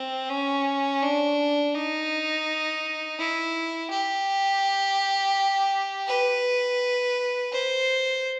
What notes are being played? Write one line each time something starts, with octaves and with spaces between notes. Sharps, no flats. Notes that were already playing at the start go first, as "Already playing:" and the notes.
Already playing: C4
C#4
D4
D#4
E4
G4
B4
C5